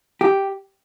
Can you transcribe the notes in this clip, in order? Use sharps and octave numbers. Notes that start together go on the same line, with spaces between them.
G4